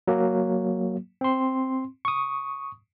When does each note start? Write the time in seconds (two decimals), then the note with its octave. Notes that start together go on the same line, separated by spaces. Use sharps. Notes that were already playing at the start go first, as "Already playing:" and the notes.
0.08 F#3 A#3
1.21 C4 C6
2.05 C#6 D#6